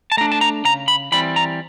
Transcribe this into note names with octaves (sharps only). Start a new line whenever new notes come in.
A5
A3 D4 A#5
A5
A#5
C#3 A#5
B5
E3 G3 C4 B5
A#5